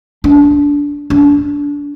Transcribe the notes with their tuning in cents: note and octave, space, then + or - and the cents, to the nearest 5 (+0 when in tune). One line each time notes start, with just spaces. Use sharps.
D4 -20
D4 -25